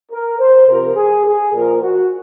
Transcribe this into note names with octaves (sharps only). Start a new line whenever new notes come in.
A#4
C5
C3 F3 A#4
G#4
G#4
A#2 F3 A#4
F#4